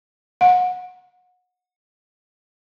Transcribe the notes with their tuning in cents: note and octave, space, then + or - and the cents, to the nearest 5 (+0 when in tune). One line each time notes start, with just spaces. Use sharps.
F#5 -30